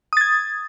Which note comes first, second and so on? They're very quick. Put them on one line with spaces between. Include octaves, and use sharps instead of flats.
D#6 A6 G#6